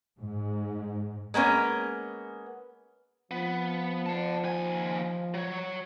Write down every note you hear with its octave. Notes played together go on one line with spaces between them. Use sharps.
G#2
G#3 A#3 B3 C#4
F3 B3
F#5 A5
D#2 G#5
F#3 C#5